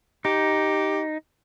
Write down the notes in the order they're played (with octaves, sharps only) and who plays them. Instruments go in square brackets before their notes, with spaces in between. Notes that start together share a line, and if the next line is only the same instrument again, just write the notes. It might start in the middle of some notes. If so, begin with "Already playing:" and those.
[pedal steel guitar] D#4 [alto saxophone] G4